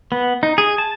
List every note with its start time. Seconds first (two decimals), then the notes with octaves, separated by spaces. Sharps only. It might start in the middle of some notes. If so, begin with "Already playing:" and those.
0.12 B3
0.43 D#4
0.58 G#4
0.78 A5